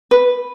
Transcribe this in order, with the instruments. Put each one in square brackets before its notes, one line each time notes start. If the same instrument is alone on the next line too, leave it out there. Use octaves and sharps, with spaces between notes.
[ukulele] B4